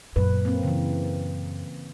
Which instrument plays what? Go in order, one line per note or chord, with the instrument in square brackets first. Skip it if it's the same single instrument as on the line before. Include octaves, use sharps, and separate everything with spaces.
[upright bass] F#2 A#2 [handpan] B4
[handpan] A#3 C4
C#3 E3